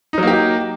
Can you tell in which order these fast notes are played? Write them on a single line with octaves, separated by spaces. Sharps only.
D#4 F#3 A#3 G4